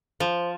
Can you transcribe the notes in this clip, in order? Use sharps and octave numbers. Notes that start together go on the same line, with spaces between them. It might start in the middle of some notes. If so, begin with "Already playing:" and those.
F3